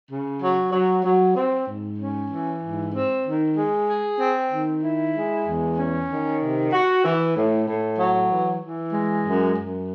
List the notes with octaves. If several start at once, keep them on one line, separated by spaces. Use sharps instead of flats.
C#3
F#3
F#3
F#3
C4
G#2
C#4
E3
G#2
C4
D#3
G#3
G#4
C4
D#3
E4
G#3
E2
C#4
D#3
C3
F#4
E3
A2
A2
F#3
E3
E3
G#3
F#2
F#2